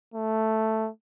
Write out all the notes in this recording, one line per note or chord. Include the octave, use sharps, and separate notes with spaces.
A3